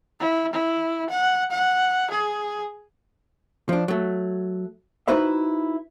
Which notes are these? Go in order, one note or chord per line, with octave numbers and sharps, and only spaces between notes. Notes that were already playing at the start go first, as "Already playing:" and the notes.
E4
E4
F#5
F#5
G#4
F3 D4
F#3 A3
D#4 E4 F#4 B4 C5 E5